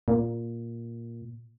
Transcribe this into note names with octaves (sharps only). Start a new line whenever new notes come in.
A#2